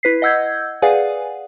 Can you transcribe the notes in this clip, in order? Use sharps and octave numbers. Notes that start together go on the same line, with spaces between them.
E4 B4 B6 C7
D#5 F#5 E6 G6 G#6
G#4 B4 D5 F5 F#5 G#5